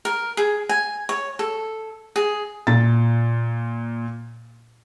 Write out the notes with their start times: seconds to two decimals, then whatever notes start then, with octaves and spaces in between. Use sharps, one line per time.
0.05 A#4
0.37 G#4
0.69 G#5
1.09 C#5
1.39 A4
2.16 G#4
2.67 A#2 A6